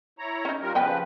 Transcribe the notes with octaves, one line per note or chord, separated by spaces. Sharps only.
E4 C#5 A#5
C#4 D#4
A#2 G3 A#4
C#3 F3 B3 B4 G5 G#5